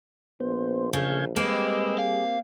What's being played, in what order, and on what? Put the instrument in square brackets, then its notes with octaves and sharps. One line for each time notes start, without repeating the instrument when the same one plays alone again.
[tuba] A#1 [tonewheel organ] B3 C5
[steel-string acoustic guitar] C#3 A3 [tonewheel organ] F5 G6 G#6
[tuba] G3 [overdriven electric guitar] G#3 [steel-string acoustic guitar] A#3 C4 G4 [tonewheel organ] B4 D#5 E6
[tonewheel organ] G#4 [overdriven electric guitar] F5